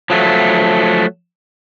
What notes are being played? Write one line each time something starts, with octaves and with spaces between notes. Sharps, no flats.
F3 F#3 A3